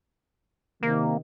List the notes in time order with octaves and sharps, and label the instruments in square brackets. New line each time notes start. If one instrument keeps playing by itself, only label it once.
[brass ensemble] C3 D#3 [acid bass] A#3